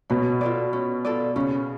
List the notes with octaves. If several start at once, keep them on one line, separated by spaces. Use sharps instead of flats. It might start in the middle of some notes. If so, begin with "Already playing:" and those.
B2 C#4
F4 A4 D5
C#4
F4 A4 D5
C#3 C#4